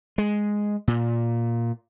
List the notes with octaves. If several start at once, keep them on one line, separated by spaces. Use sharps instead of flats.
G#3
A#2